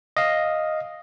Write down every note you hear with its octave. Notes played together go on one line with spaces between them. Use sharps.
D#5 F5